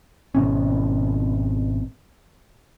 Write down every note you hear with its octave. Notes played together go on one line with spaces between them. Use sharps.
G#1 B2 C#4